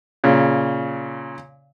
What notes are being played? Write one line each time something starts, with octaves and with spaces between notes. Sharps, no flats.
A#2 C#3